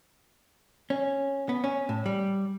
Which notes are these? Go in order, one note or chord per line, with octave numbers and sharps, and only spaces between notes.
C#4
B3
C#4
A2
G3